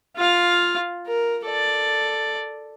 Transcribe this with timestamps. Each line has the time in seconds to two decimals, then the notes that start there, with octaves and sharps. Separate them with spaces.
0.17 F4 F5
1.07 A#4
1.46 A4 D5